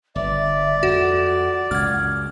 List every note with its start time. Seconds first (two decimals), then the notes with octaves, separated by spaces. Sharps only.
0.16 G1 D5 E5
0.83 F2 F#4 F#5
1.71 C#2 F#2 F6 G#6